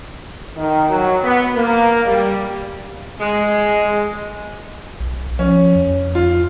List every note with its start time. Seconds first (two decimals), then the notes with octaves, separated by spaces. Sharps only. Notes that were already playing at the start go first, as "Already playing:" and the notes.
0.57 D#3
0.90 F#3
1.23 B3
1.55 A#3
2.05 G3
3.20 G#3
5.00 B1
5.39 F3 C#4
5.75 F2
6.15 F4